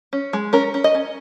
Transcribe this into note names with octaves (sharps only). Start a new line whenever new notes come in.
C#4
G#3
C#4 A#4
C#4
D#5
C#4